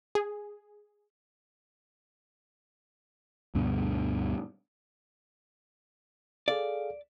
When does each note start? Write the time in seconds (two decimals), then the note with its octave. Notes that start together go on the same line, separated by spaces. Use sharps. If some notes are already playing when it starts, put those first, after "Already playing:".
0.15 G#4
3.55 D2 G2 B2 D3
6.48 G#4 A4 D5 F5